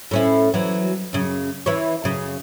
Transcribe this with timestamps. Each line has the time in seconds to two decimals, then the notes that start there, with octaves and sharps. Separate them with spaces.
0.11 A2 C#4 E4
0.54 E3 F#3
1.13 F#2 C#3
1.66 E3 E4 C#5
2.04 F#2 C#3